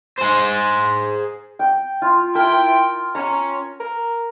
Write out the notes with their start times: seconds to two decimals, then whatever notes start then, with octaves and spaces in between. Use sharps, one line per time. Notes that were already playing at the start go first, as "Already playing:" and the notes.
0.18 G#4 C5
1.59 G5
2.02 F4
2.35 E4 A#4 G5
3.15 C#4 A#5
3.80 A#4